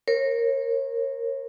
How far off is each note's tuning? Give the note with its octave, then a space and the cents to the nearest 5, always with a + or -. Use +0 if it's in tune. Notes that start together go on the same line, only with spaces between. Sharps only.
A#4 -10 C#5 -35